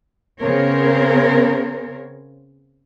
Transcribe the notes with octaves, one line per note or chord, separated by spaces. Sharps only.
C#3 B3 C4 A#4 C#5